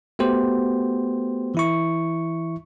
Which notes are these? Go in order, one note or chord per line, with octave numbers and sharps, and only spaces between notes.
A3 B3 F#4 G4 C5
E3 E4 C#6